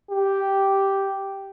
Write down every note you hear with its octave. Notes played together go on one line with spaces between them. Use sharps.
G4